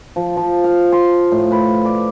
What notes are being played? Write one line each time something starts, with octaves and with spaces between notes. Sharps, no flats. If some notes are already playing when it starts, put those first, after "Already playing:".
F3
F3
F5
C6
A2
B4
D5